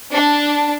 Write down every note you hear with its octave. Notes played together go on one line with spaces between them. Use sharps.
D4